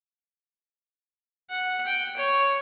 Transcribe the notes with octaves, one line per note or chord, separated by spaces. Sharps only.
F#5
G5
C#5